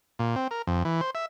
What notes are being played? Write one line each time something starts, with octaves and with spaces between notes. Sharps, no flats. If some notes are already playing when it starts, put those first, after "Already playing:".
A#2
C4
A#4
F2
E3
C5
E5